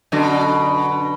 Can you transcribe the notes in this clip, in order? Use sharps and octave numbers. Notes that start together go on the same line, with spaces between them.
F#2 B2 D3